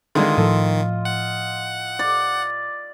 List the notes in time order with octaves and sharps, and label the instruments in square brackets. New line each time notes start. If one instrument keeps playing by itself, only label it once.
[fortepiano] D3 G#3 [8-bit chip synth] D#3 [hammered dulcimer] F4 D#5 C6
[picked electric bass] A2 F3 [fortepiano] A4
[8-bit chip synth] F#5
[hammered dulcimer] D5